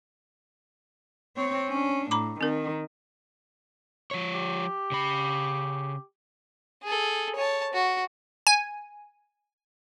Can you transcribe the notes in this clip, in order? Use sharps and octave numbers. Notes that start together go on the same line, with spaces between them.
C4 C#5
C#4 D4
A2 A#5 B5 D6
D#3 C4 A#4
F3 C#5
G4
C#3 B5
G#4 A4
C#5 A5
F#4
G#5